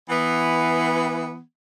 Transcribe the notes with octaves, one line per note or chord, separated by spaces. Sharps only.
E3 B3